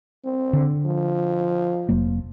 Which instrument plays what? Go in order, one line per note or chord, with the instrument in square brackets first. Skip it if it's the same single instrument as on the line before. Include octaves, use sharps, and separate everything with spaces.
[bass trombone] C4
[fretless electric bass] D3
[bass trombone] F3
[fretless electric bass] F1 F#3 A#3